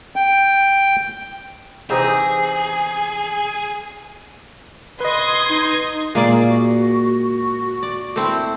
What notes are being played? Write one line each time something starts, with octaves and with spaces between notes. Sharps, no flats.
G5
E2 C3 D#4 G#4
B4 D#5 C6 D#6 G#6
D#4
A#2 G#3 A#3 G#4 D5 F5
F#4
D5
A3 C4 E4